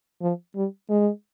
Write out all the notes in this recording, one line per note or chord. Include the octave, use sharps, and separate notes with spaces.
F3
G3
G#3